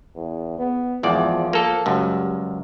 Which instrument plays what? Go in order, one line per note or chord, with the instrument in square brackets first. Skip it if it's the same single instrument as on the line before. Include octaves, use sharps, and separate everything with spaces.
[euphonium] E2
B3
[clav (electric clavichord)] G#1 E2 D5 [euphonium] F3
[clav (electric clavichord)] A#3 A4
[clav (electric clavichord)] C#2 F#2 [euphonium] G3